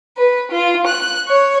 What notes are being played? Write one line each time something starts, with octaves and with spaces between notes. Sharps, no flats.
B4
F4
F#6
C#5